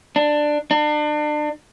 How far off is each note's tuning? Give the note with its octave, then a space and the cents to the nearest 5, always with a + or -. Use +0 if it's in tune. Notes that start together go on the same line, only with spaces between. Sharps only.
D4 +15
D4 +35